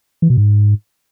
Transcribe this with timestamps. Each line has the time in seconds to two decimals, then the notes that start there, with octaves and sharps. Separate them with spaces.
0.22 E3
0.30 B2
0.37 G#2